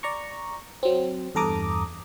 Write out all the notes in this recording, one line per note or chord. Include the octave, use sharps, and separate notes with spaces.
D5 A#5 C#6
F#3 C4
E2 G2 A4 A#5 D6 D#6